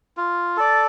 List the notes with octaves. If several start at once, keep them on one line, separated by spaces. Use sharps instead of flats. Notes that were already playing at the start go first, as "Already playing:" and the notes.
F4
A4 D5